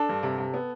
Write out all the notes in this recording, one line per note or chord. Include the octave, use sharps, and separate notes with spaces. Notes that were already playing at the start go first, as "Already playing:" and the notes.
Already playing: D4 A4
G2
C3
C3
B3